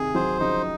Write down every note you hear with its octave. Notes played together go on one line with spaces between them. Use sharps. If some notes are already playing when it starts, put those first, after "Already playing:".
Already playing: C3 D#3 G#4
D#3 F#3 C5
C#3 F3 D#4